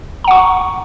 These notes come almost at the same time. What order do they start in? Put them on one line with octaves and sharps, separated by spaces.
A#5 F#5 C#6